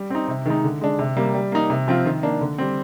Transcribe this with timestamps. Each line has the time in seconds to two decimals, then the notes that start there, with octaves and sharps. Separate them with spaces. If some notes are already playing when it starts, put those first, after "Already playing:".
Already playing: G3
0.10 C4 D#4
0.28 C3
0.46 D#3 G#3 D#4
0.64 D3
0.81 G#3 D4
0.99 C3
1.17 G3 A#3
1.34 G3
1.52 A#3 D#4
1.70 C3
1.88 F3 C4 F4
2.05 D#3
2.23 A#3 D4
2.41 D3
2.58 G3 C4